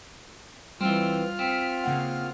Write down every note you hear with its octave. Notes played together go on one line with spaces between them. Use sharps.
E3 G3 C4 F4 F6
C4 B6 C#7
C#3 A#3 F#5